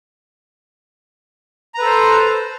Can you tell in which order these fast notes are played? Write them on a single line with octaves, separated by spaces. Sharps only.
A#5 B4 A4 C5